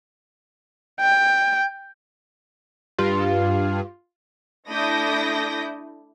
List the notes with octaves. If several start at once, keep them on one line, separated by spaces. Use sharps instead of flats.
G5
G2 F4
A3 D4 E4 D#6 G6 A#6